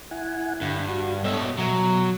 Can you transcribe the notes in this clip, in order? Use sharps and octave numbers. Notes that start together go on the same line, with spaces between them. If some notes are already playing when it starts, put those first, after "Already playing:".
E4 F#5 G#5
G2 D3
F#4
B2 A4 C#5 D#5 E5
B2 F#3